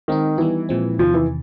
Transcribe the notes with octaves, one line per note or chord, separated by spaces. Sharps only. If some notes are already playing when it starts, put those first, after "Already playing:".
D#3 G#3 C4 D#4
E3 G3 B3 D#4
A#2 F3 G#3 C4
E2 C3 D#3 F3
E3